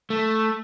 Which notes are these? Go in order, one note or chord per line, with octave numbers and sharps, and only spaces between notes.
A3